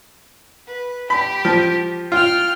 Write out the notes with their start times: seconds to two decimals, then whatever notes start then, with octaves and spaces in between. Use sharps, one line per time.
0.67 B4
1.10 G4 B5
1.45 F3
2.12 F4 G5 F6